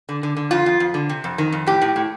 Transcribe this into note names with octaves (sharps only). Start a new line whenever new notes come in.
D3
D3
D3
F2 F4
F2
F2
D3
C3
F2
D#3
F2
A2 G4
A2
A2